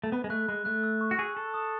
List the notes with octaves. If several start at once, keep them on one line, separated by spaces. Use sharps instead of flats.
A3
B3 B5
G#3
A3 F#6
G#3 B5
A3 F#6
E6
C#6
F#4
G#4 E6
A4 C#6
D#6